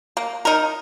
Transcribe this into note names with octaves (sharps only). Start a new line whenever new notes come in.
A#3
D#4 A#4